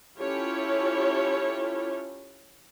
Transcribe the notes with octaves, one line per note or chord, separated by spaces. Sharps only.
C#4 E4 F4 G4 A4 C#5